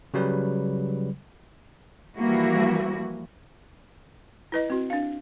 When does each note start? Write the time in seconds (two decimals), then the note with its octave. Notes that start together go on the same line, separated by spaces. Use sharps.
0.14 C#3 F#3 G3 B4
2.17 E3 F3 G3 A#3 E4 F#4
4.52 E4 B4 D#5
4.70 C4 F#4
4.90 D4 F5